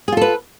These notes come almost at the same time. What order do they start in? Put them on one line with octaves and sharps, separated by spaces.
G#4 F4 A4 B4